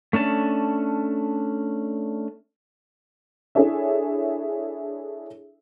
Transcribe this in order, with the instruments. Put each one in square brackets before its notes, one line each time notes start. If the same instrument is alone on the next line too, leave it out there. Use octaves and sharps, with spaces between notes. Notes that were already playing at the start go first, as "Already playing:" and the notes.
[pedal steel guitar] A3 C#4 D4 A5
[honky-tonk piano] D4 E4 G#4 A4 C#5 E5